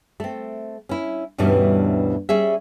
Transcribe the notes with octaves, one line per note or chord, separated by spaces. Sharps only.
A3 C4
C#4 E4
D2 G2 B2 E3 G3 C#4
G3 C#4 G#4 E5